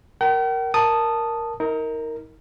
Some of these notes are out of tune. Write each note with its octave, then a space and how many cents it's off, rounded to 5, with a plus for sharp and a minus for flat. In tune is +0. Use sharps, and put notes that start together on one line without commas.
A#4 +0 G5 -45
A#4 +0 A5 +0 D#6 -10
D#4 +35 A#4 -10